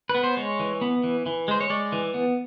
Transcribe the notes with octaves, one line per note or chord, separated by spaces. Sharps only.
B4
B3
C5
G#3 C#5
E3
B3
E3
E3
G#3 C5
C#5
G#3 D5
E3
B3